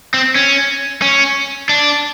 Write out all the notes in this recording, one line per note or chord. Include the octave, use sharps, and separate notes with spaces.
C4
C#4
C#4
D4